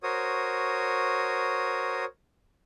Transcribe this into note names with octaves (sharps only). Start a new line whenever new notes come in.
F#4 A#4 C5 C#5 D#6